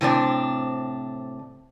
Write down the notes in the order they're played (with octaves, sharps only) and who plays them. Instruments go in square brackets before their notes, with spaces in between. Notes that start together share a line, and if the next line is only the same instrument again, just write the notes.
[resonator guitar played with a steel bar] A2 C3 C4 D4